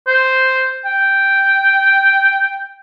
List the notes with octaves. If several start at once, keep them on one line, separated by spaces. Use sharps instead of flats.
C5
G5